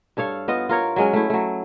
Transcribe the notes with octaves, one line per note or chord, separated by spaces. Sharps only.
G2 A4 C#5 F5
B3 F4 D#5
F4 A#4 C#5
F#3 G#3 C#4
A3 E4
F#3 A3